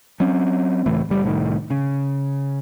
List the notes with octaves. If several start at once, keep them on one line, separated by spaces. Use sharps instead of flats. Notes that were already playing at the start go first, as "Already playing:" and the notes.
F#3 C4 C#4
C#2 A2 E3 A3
F#1 G3
C2 A2 D#3
C#3